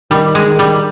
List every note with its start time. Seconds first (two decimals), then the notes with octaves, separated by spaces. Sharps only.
0.11 D#3 G3
0.35 G#3
0.47 D#3
0.59 G3